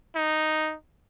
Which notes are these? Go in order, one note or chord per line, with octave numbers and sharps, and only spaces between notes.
D#4